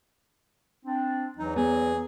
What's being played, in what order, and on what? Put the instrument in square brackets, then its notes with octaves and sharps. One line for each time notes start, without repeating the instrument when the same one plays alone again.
[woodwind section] C4 D4
[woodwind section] E2 E3 F#3 [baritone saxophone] D#4
[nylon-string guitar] B3 [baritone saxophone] G#4